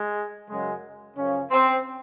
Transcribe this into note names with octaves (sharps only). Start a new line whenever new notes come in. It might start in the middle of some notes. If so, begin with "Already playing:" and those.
Already playing: G#3
F#2 C#3 F#3 G#3
F#2 C#3 F3 C#4
C4